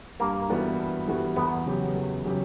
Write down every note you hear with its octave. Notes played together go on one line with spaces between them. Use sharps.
G2 A#3
E3 G3 B3 F#4
G2
E3 G3 B3 F#4
E2 B3
C#3 F#3 C#4 G4
E2
C#3 F#3 C#4 G4